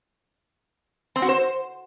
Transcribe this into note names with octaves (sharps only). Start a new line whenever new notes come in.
C4
F#4
C5